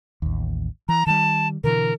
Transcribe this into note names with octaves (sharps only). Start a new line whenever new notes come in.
A1 D#2
E3 A#5
D#3 G3 A5
B2 D3 E3 A#4